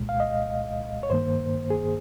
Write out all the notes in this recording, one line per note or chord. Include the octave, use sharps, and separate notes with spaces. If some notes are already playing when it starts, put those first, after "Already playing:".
Already playing: C2 A#2 G#3
F5
D#5
C#5
G2 D#3 A#3 C5
G#4